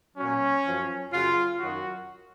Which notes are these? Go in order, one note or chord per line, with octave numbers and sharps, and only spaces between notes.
A#2 F#3 C#4
F#2 F3
F#2 C#3 F#3 F4
F#2 D#3 F#3 F#4